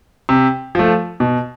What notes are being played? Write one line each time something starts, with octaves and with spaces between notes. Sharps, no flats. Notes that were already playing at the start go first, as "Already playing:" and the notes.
C3
F3 A3
B2